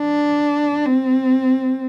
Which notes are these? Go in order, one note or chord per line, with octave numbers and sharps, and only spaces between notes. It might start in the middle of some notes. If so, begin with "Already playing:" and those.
Already playing: D4
C4